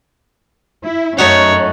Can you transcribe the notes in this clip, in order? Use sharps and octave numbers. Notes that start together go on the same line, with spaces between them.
E4
F#2 A3 C#4 D#4 F#4 C#5